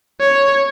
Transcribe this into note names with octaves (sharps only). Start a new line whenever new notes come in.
C#5